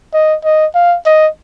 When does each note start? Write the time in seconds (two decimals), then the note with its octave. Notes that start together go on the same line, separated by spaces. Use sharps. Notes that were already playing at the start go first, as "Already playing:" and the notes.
0.14 D#5
0.44 D#5
0.75 F5
1.06 D#5